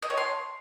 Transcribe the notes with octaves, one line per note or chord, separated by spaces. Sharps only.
D#5
C#5
C6